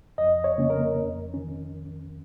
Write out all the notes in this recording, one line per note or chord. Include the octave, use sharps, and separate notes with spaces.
F2 D#5
C#5
C#3 A#3 C#4
A#4
F2
D#3 C#4